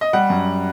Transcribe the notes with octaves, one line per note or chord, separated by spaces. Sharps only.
D#5
G3 F#5
F#2